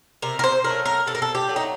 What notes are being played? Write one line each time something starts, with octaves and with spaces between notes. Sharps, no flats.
C3 A#4
A#4
C5
F#3 A3 A#4
A#4
C3 A4
A#4
A4
G4
F#3 A3
D#4